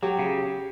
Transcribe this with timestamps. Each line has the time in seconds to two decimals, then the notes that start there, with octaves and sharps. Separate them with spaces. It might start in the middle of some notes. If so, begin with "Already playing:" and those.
0.03 F#3 G4
0.19 C#3